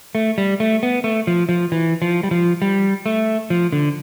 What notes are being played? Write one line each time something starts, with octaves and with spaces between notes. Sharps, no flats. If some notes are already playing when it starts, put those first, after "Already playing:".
A3
G3
A3
B3
A3
F3
F3
E3
F3
G3
F3
G3
A3
F3
D3